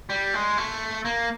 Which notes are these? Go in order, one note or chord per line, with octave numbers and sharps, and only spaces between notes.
G3
G#3
A3
A#3